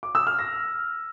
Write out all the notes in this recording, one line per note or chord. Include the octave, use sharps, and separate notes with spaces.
D6
E6
F6
A#6